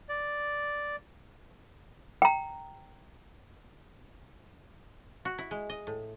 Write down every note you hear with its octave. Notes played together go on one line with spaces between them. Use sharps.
D5
G5 A#5
F#4
E4
G#3
D#5
A2